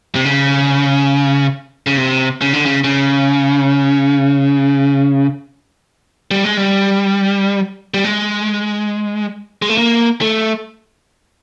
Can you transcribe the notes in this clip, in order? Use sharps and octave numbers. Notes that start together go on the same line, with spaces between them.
C3
C#3
C#3
C3
C#3
D3
C#3
C#3
G3
G#3
G3
G3
G#3
G#3
A3
A#3
A3